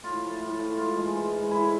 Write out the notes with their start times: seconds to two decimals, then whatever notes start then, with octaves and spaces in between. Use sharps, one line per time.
0.03 A2 F4
0.22 F3 A3
0.41 A2
0.59 F3 A3
0.77 G#2 F4
0.96 E3 G#3
1.15 G#2
1.33 E3 G#3
1.51 A2 E4